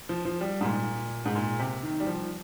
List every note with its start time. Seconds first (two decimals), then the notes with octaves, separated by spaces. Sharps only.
0.09 F3
0.25 F3
0.41 G3
0.61 G#2
0.65 A#2
1.25 G#2
1.35 A#2
1.59 C3
1.83 D#3
2.00 G3
2.07 F3